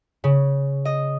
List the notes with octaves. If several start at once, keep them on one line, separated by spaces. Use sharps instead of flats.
C#3
D#5